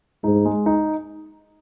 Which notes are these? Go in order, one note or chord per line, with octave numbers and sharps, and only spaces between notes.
G#2 D#4
G#3
D#4